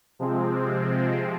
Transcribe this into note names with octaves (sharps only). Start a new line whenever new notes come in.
C3 F3 G#3 C4